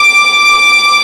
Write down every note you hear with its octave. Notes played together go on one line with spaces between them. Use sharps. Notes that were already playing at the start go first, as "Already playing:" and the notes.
Already playing: D6